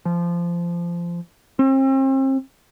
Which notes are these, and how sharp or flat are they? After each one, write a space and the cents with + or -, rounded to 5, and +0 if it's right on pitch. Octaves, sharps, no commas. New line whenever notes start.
F3 -20
C4 +40